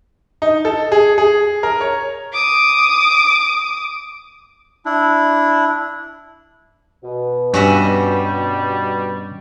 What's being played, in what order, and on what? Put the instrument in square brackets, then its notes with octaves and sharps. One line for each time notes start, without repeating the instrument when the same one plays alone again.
[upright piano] D#4
A4
G#4
G#4
A#4
C#5
[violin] D6 D#6
[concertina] D4 E4
[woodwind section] B2
[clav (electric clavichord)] G2 [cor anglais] G3 [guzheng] C#4 F#4 E5